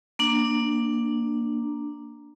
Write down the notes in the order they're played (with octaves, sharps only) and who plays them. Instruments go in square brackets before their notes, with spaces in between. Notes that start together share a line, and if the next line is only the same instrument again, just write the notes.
[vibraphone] A#3 D4